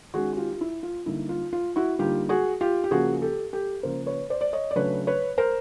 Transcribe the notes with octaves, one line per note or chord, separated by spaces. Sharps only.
D#3 G#3 C#4 F#4 G#4
F#4
F4 G4
F4
E4
F4
D3 G3 A#3 D#4 E4
F4
F4
E4 F#4
D3 G3 A#3 D#4 F4 G4
F#4 G#4
F4 G4
G4
C#3 F3 A#3 C#4 F#4 G#4
G4 A4
G4 A4
C#3 F3 A#3 C#4 A#4 C5
B4 C#5
C5 D5
D5
C#5 D#5
D5
C#3 F#3 A3 D4 B4 C#5
B4 C#5
A#4 C5